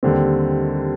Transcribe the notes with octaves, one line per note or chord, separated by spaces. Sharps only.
D#2 D3 G3 C4